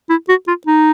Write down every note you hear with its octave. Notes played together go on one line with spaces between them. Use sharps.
E4
F#4
F4
D#4